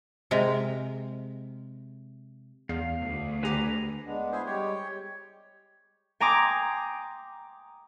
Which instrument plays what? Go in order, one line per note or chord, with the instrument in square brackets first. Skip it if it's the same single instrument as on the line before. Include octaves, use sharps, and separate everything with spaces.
[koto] C3 G#3 A#4 G5
[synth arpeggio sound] E2 [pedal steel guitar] F5
[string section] D2
[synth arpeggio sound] D3 G4 [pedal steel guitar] B4 G#5 A#5
[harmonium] G#3 B3 D4
[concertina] E4 G#4 C5
[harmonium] G3 G#3 [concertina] G4 C#5
[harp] G5 G#5 A#5 C6 D6 D#6